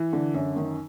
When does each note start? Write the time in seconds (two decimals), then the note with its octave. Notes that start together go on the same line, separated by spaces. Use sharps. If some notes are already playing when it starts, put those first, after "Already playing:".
Already playing: E3
0.13 D3
0.34 F#2
0.56 D#3